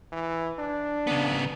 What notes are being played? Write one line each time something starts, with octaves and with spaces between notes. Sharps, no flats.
E3
D4
C#3 B3